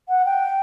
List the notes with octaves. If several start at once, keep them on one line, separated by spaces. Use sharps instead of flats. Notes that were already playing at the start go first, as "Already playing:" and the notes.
F#5
G5